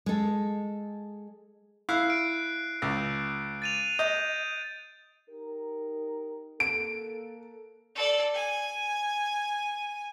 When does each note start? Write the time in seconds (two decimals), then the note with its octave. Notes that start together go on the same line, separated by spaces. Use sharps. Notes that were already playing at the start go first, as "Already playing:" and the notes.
0.06 G#3 A4
1.89 E4 F5 F#6 C7
2.10 D7
2.82 C#2
3.62 A6 D#7 F7
3.99 D#5 G6
5.29 D#4 G4 A#4
6.60 A#3 A4 D7
7.95 A4 D5
8.34 G#5